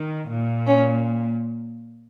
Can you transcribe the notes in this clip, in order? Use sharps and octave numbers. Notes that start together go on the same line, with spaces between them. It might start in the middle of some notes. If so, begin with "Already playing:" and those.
Already playing: D#3
A#2
C#4